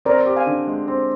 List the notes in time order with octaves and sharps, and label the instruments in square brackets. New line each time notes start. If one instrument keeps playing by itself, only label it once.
[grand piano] C4 [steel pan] A#4 D5
[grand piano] G4
[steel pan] F5 G#5
[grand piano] D3
G#3
C4